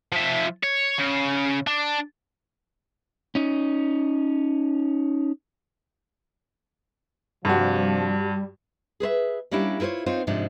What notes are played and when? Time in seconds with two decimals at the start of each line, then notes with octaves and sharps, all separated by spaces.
0.12 F3 E5
0.63 C#5
0.99 C#3
1.67 D4
3.35 C#4 D#4
7.45 G2 C3 F3 G3 D4 F#4
9.00 G#4 B4 C5 E5
9.51 G3 A#3 C#4 D4 E4 G4
9.80 E4 F4 A#4 C5 C#5
10.06 C4 D#4 F4 C5 C#5
10.27 G#2 C3 F3 D4 D#4